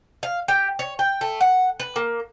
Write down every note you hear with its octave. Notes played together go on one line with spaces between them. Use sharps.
F5
G4
C#5
G5
A3
F#5
B4
A#3